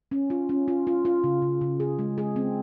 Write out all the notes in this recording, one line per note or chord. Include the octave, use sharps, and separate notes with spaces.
C#4
F4
C#4
F4
F4
F4
C#3
C#3
C#3
G#4
G#3
G#4
C4